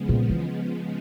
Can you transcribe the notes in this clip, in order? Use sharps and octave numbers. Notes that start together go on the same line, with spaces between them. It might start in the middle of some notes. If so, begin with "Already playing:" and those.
Already playing: C#3 F3 G#3 B3
A#2
E3